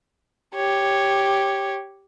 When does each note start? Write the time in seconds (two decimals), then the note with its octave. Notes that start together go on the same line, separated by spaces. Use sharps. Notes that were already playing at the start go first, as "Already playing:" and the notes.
0.55 G4 C#5